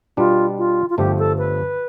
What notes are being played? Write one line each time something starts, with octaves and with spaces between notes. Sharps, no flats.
B2 G3 B3 D4 F4
F4
F4
G1 G2 F3 A3 G4
A4
B4